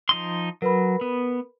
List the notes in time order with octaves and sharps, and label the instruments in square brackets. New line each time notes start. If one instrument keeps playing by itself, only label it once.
[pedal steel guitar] F3 D#4 C6
[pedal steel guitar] F#3 [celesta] A#4 B4 B5
[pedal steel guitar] B3